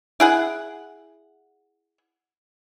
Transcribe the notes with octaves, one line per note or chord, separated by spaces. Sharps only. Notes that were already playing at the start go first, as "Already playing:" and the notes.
E4 G#4 F#5